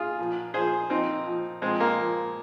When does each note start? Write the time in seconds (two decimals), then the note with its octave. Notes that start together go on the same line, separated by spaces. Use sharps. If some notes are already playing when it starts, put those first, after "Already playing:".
Already playing: F4 G#4
0.19 A#2 F3
0.54 A#2 F3 G#4 C5
0.90 A#2 F3 C4 D#4
1.26 A#2 F3
1.62 A#2 F3 G#3 C4
1.80 A#3
1.98 A#2 F3